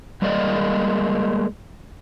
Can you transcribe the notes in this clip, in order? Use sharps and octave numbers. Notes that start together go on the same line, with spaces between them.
G3 G#3 A#3 D5 D#5